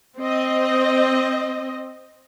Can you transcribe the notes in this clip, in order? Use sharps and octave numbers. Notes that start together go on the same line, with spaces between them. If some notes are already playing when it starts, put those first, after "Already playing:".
C4 D#5